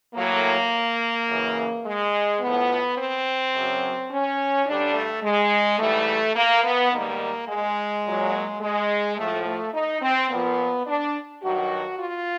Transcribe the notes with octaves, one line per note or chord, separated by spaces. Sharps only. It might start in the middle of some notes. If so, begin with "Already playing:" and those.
A2 F#3 A#3
F#2 C#3 E3
G#3
A2 F3 B3
C4
F#2 C#3 F#3
C#4
G2 D3 G3 D4
A3
G#3
G#2 E3 G3 A3
A#3
B3
G#2 D#3 G3 A#3
G#3
A#2 F#3
G#3
A2 F3 A3
A3
D#4
C4
A#2 F3 B3
D4
G2 D#3 F#3 F#4
F4